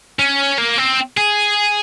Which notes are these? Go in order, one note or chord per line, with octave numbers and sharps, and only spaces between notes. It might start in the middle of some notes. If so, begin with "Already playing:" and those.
C#4
A#3
C4
G#4